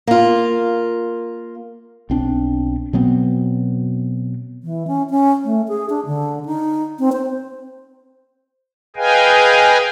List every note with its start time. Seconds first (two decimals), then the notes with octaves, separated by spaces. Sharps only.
0.07 A#3 F4
2.10 B1 C4 D4
2.93 B2 F#3 B3 C4
4.63 E3
4.87 C#4
5.10 C#4
5.45 A3
5.68 G#4
5.89 D4
6.06 D3
6.45 D#4
6.99 C4
7.13 C5
8.96 G#4 B4 D#5 F5 G5 G#5